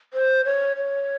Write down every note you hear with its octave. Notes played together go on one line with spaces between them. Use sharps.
C5
C#5
C#5